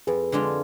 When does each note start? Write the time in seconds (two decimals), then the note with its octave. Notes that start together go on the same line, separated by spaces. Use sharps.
0.07 F2 G#4 B4
0.32 D3 G#3 D4 F4